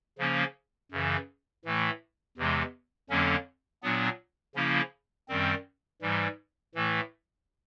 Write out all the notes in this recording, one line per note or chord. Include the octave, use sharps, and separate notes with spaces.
C#3 F3 A#3 C#4
F#2 C#3 E3
A2 E3 A3
E2 C3 E3 G#3
F2 D3 F#3 A#3 C#4
A#2 F#3 B3 D4
C#3 F3 A#3 C#4 E4
F#2 D#3 G3 C4
G#2 E3 G3
A2 E3 A3